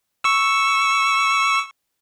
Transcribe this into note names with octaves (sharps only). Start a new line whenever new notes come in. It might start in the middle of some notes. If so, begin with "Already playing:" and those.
C#6 E6